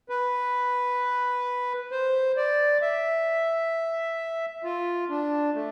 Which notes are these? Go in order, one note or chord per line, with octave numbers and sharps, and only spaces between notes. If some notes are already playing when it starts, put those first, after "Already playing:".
B4
C5
D5
E5
F4
D4
A3